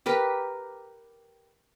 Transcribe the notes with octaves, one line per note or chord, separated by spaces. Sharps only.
G4 A#4 B4